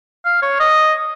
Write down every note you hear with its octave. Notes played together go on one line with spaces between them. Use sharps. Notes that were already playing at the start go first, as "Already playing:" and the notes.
F5
C#5
D#5